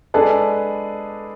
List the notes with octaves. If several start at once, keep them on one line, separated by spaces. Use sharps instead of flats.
G#3 D4 G#4 A4 B4 D5 A5